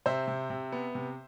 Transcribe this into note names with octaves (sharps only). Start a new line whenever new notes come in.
C3 C5 E5
C3
C3
B3
C3